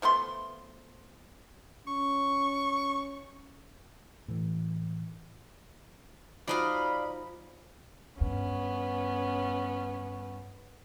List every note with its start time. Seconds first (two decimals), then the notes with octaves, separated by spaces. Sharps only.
0.02 F3 A3 B3 C6
1.87 C#4 C#6
4.28 A2 E3
6.48 F3 D#4 F#4 D5 D#5 F5 B5
8.21 G2 B3 C#4